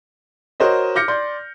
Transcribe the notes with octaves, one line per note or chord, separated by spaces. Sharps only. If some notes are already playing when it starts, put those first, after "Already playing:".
F#4 A#4 C5 C#5 D#5
D6 F6 G6 A#6 C#7
D5 C6 G6